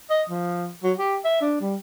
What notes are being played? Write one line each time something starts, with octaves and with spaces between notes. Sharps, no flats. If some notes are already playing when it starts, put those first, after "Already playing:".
D#5
F3
F#3
G4
E5
D4
G3